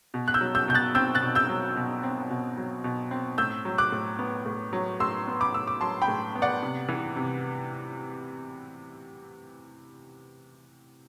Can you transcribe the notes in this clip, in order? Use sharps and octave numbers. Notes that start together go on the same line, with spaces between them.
B2
F#6
E6 G6
F#3
E6 G6
B2 G6
F#6 A6
C4 E6 G6
F#6 A6
B2
E6 G6
F#3
B2
C4
B2
F#3
B2
C4
A2 E6 G6
F#3
D6 F#6
A2
B3
A2
F#3
A2 C6 E6
B3
B5 D6
A2 E6
D6
F#3 A5 C6
G5 B5
A2
B3
D5 F#5
C3
E3
C3